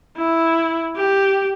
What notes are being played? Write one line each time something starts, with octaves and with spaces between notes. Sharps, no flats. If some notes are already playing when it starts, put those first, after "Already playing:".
E4
G4